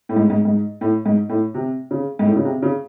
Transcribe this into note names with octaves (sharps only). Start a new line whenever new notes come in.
A2
G#2
G#2
G#2
A2
G#2
A2
C3
C#3
G#2
A2
C#3
C3
C#3